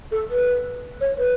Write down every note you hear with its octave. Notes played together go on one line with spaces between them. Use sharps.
A4
B4
C#5
B4